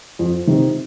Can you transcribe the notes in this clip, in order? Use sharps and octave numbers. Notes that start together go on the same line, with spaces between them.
F2
C3 D#3